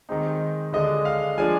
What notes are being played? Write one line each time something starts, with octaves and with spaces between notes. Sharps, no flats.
D#3 G#3 C4 D#4
D3 G#3 D4 D#5
F5
F3 G#3 D4 G#5